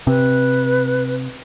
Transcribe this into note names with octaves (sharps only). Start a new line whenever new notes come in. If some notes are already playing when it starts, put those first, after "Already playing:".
C3 B4